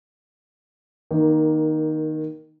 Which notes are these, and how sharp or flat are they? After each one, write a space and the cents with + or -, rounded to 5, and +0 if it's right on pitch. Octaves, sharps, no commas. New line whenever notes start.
D#3 -5 A#3 +15